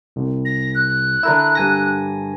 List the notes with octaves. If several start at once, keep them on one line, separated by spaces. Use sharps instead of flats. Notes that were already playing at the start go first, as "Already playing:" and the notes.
C2
A#6
F#6
D3 E4 A#4 E6
G2 G#5 A#6